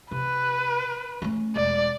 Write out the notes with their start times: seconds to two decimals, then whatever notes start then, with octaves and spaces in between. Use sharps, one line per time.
0.11 C3 B4
1.22 A3 C#4
1.56 E1 D5